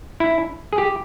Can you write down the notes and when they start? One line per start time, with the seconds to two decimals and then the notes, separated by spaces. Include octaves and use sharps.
0.20 E4
0.73 G#4
0.78 G4